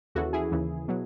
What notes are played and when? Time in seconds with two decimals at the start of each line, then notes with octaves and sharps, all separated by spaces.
0.15 D#2 C#3 E3 F#4 A4
0.33 E4 G#4
0.51 D#2 C#3 E3
0.88 B2 F#3